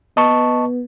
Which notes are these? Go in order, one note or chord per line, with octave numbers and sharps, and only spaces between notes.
B3 D#5 A5 C#6